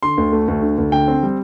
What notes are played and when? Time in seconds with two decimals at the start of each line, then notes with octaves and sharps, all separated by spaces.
0.03 D3 C6
0.18 D2
0.32 A3
0.48 D2
0.62 D3
0.78 D2
0.92 D3 G5
1.08 C4
1.23 G3